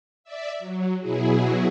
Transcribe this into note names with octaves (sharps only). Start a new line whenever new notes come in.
D5 E5
F#3
B2 F#3 E4 G#4